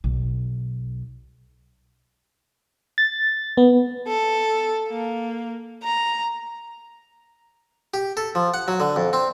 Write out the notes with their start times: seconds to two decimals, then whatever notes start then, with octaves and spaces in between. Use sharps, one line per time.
0.04 B1
2.98 A6
3.57 B3
4.08 A4
4.89 A#3
5.84 A#5
7.94 G4
8.17 A4
8.35 F3
8.54 F#5
8.68 F#3
8.80 D3
8.96 F2
9.13 C4